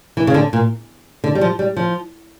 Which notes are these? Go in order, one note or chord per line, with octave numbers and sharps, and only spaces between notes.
E3
C#3
D3
A#2
D3
G3
F3
G3
F3